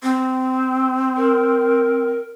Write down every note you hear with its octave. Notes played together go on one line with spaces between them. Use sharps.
C4
A#4